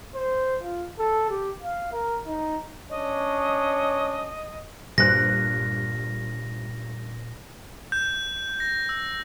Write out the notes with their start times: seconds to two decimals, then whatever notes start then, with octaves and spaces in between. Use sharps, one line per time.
0.15 C5
0.61 F4
0.99 A4
1.30 G4
1.62 F5
1.93 A#4
2.26 D#4
2.90 C#4 D4 C#5 D#5
4.98 G2 A#2 C5 F#6 A#6
7.92 G6
8.60 A#6
8.89 E6